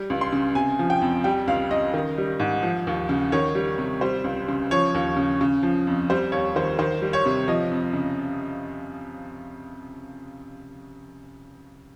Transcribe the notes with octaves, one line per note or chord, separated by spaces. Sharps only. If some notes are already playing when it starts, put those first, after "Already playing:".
Already playing: G3
C#2
C6
C#3
C3 G#5
F3
G5
F2
G3 G5
C#2 F5
C#3 D#5
D#3
G3
G#2
F3
D#2
C#3
D#3 C#5
G3
C3
G3 C5
C#2
C#3
F3 C#5
D#2
C#3
C#3
F3
F2
G3 C5
D#2 C#5
D#3 C5
D#3 C5
G3
C#5
C3
F3 D#5
F2
C#3